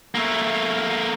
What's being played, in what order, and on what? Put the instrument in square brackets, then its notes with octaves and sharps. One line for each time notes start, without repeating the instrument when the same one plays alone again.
[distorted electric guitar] A3 A#3